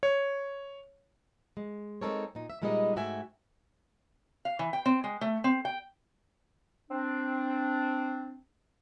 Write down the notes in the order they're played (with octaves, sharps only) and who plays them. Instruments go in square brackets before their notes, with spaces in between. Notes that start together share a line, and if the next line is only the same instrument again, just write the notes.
[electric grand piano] C#5
[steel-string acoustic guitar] G#3
G#3 C4 D#4 A4 A#4 C#5
A#2 D#4
E5
A#2 G3 G#3 B3 D#4 D#5
G#2 A3 F#4 E5 G5 G#5
[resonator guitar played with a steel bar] F5
E3
G5
C4
G#3
A3
C4
G5
[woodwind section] C4 D4